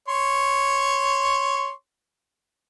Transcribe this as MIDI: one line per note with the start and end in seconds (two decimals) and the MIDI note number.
0.08 1.71 73
0.08 1.71 84
0.08 1.71 85